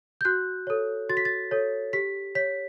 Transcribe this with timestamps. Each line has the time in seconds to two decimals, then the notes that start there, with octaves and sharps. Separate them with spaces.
0.21 G6
0.25 F#4 F#6
0.67 A4 C#5
1.09 F#4 A6
1.17 B6
1.25 A6
1.51 A4 C#5
1.93 G4 B6
2.35 C#5 B6